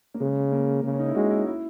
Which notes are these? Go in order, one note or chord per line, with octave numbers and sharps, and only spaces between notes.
A#3
C#3 G#3
A#3
C#3
C#4
D#4
E4
G#3 F#4
E4
E4